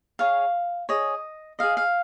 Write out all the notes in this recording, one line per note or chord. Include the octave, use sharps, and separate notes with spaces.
G#4 C#5 F5
G#4 C#5 D#5
G#4 D#5 F5
F5